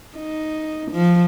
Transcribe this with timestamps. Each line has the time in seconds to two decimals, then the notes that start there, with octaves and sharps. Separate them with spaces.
0.17 D#4
0.91 F3